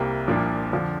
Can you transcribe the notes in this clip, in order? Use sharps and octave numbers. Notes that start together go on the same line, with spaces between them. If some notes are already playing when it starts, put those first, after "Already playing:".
Already playing: C2 C3 G3 A#3
C2 A#2 F3 D4
F2 D3 F3 D4